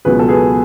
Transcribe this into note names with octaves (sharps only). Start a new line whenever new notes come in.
C#2 B2 F#3 G#4 B4
A4
G#4 B4